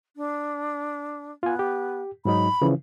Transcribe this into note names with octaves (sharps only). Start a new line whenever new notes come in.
D4
B3 F4 G#5
G4
G#2 F#3 D#4 B5
C#3 E3 F3